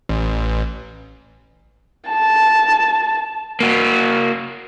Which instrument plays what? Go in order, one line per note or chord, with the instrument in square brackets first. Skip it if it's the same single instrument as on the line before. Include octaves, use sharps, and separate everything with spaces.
[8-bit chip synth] A1
[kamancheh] A5
[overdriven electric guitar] A#3 F#4